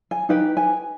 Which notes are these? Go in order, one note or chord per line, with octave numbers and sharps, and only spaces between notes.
G#5
D#4 G4 B4 G5
G#5